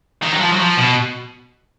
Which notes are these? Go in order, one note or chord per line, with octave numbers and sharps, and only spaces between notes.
D#3
F#3
F3
F#3
F3
B2